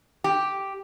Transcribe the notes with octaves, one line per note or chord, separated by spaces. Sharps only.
G4